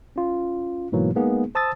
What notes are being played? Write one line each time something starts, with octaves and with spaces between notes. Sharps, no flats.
C#4 F4
G#2 B2 E3 F#3 A#3
G#3 A#3 B3 D#4 G#4
C5 A5 D#6 E6 A6